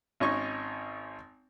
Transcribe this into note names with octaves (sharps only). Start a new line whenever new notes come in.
G#1 C#4 D#4 C#6